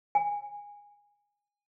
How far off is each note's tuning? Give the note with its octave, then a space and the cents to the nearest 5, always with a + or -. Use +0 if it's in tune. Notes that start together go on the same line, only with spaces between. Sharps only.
G#5 -15